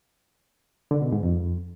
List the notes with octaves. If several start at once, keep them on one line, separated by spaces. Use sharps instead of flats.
D3
B2
G#2
F2